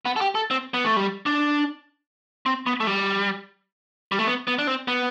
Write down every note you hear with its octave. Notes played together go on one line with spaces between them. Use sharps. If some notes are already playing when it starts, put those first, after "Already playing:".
B3
A4
G4
A4
C4
B3
A3
G3
D4
C4
B3
A3
G3
G3
A3
B3
B3
D4
C4
B3